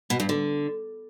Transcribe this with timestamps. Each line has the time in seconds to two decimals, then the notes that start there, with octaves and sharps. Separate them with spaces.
0.10 B2
0.20 G2
0.29 D3